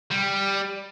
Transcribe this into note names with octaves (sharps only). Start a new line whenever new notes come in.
G3